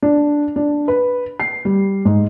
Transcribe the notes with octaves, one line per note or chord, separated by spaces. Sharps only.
D4
D4
B4
C7
G3
G#2